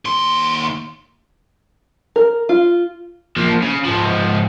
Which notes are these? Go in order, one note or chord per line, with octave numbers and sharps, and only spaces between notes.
D#2 C6
A#4
F4
F3 A#3
C#3
G#2 F3